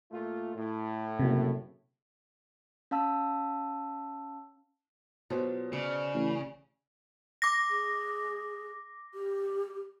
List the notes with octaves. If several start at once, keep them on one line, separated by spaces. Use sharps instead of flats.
A#2 A3 F4
A2
F#1 C3
C#4 F5 A5 E6
B2 F#3 F4 G4 C5
C#3 D5
A1
D6 A#6
G#4
G4